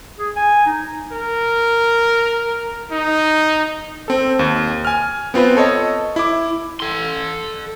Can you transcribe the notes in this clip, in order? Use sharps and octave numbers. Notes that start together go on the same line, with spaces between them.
G#4
G#5
D#4
A#4
D#4
C4 A4
D#2
G#5 F6
B3 C4 F4 B4
A4 C#5 D#5
E4 D6
A4 C6